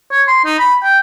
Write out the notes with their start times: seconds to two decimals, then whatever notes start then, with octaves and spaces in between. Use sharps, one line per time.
0.11 C#5
0.28 C6
0.45 D#4
0.59 B5
0.83 G5